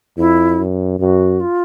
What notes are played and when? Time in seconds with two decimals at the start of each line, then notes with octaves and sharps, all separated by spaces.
0.17 F2 E4
0.59 F#2
0.99 F#2 F#4
1.40 F4